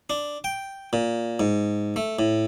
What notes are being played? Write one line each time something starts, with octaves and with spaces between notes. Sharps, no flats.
D4
G5
A#2
G#2
A3
A2